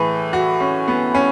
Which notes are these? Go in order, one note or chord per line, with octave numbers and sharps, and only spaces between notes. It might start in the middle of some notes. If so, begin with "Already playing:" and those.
Already playing: A2 E3 G#4 B4
F#4
C#4
B3
C#4